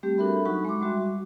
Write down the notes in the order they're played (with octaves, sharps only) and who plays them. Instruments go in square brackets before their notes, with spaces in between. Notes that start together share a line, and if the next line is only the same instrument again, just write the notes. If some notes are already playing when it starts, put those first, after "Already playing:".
[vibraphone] G3 A3 C4 G4
D4 F#4 A4 A#4 E5 B5
F#3 D#4 F#4 F#5 B5 C#6
G#3 C6 D6
G3 F#4 E5
F#4